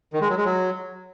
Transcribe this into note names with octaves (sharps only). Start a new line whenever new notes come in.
D#3
G#3
F#3
G#3
F#3